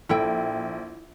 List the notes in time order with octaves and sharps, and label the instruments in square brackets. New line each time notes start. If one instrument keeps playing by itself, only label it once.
[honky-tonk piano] A#1 [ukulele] E4 A4 G5